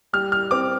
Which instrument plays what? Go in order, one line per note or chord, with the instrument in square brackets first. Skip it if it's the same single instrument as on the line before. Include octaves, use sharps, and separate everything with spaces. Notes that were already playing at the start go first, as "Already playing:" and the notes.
[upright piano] G3 F6
F6
C4 D6